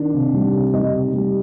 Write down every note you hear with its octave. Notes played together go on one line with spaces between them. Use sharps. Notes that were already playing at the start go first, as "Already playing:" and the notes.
Already playing: D#3 D4
C3
G3
C3
G3 D#4 D#5
C3
G3